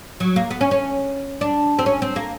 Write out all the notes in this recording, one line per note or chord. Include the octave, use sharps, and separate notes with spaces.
F#3
A#3
B3
C#4
C#4
D4
C4
C#4
C4
A#3